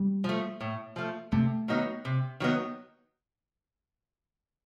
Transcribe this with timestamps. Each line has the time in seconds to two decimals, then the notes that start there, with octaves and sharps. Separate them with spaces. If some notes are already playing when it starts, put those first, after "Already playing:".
Already playing: G3
0.24 F3 A3
0.61 A2
0.96 F3 A3
1.32 C3 A3
1.68 D#3 F#3 B3 D#4
2.05 C3
2.40 D#3 F#3 B3 D#4